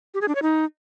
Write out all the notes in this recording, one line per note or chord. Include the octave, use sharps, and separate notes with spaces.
G4
G#4
D4
C#5
D#4